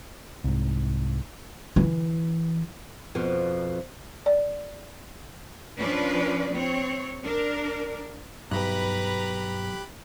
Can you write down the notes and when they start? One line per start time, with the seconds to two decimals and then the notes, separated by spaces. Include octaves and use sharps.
0.44 C2 G#2
1.76 E3 E4
3.15 F2 B2 F3
4.26 D5
5.79 F3 C#4 D4 F4 B4 D5
6.54 C4 C#5
7.24 D4 A#4
8.51 B1 G2 G4 B4 A#5 B5 F#6